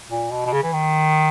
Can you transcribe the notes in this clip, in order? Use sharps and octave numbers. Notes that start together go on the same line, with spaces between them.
A#2
B2
B2
C#3
E3
D#3